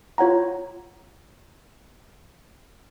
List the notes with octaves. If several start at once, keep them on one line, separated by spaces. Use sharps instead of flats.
F4 C#5 F#5 A#5